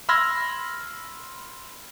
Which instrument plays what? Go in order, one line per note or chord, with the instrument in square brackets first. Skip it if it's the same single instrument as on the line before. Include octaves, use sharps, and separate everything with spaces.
[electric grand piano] B5 C6 E6 F6 G#6 A#6